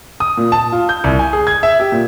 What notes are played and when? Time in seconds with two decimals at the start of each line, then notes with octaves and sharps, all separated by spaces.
0.20 D#6
0.37 A#2
0.52 A5
0.72 F4
0.89 G6
1.04 C2
1.19 G#5
1.33 G#4
1.47 G#6
1.63 E5
1.80 G4
1.92 A#2